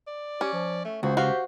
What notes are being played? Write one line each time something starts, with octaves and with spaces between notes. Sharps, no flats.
D5
C#4 G4
F3
A3
C#2 F#4 C5
F#4 G4 F5